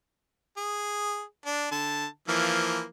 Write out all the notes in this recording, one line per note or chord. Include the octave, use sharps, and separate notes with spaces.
G#4
D4
D3 A5
E3 F3 A#3